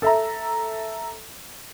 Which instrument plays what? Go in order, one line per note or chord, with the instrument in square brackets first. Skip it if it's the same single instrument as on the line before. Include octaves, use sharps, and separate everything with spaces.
[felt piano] A4 E5 A#5